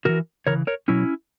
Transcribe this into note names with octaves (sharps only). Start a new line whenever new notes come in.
C#3 E3 F#4 A#4
C#3 E3 A#4 C#5
A#4 C#5
B2 F#3 C#4 E4